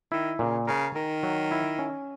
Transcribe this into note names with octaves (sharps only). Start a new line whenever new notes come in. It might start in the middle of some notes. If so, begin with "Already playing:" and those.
D#3 E4
A#2 C#3
C#3 A#4
D#3 A#4
F#3
E4
C#4